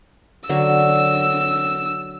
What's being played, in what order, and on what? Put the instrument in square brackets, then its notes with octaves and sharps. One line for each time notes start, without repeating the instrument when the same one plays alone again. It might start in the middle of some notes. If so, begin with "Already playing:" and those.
[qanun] D3 F#3 F#4 [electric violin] E6